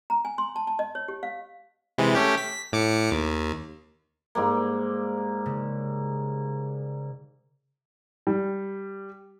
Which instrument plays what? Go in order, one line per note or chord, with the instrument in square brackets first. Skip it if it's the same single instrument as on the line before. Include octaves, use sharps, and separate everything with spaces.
[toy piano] A#5
G#5
C6
A5
A5
D#5
C#5
G4
F5
[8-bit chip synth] C3 E3 G#3
A3 C#4 G4
B6
A2 D6 C#7
D#2
[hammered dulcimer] G#2 G3 A#3
[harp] C#3
[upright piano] G3